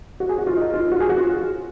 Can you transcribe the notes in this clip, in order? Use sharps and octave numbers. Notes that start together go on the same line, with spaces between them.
F#4
G#4
F#4
F4
D#4
F4
F#4
G#4
F#4
F4